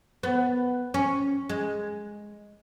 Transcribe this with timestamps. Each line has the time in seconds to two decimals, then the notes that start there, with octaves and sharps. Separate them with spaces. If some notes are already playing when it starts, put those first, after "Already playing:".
0.23 B3
0.94 C#4
1.49 G#3